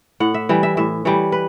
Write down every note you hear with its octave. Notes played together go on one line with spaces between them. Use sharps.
A2 F#5
E5
E3 G3
E5
A2 E5
E3 G3 C#5
B4